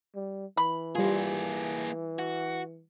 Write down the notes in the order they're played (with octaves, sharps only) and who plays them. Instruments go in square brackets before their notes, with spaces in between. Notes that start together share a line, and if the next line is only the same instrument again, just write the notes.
[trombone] G3
[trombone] E3 [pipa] B5
[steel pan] G3 F4 [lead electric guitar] A#3 G#4
[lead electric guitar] F#4